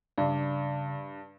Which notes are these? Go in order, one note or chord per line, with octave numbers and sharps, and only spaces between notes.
G2 C#3 D5